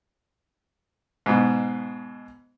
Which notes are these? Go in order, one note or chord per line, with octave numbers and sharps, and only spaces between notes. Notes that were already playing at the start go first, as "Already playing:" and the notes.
G#2 B2